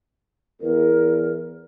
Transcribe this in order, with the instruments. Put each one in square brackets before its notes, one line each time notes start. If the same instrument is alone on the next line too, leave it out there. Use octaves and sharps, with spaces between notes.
[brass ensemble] E2 [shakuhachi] A#4